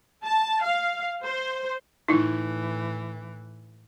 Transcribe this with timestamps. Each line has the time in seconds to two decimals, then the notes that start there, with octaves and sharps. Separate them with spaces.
0.24 A5
0.64 F5
1.24 C5
2.08 A2 E3 D#4 E4